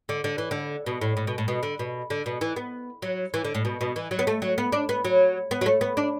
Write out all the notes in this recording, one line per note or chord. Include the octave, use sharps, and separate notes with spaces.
D3
D3
E3
D3
B2
A2
A2
B2
A2
B2
D3
B2
D3
B2
E3
B3
F#3
E3
D3
A2
B2
B2
E3
F#3
B3
A3
F#3
B3
D4
B3
F#3
B3
F#3
A3
B3
D4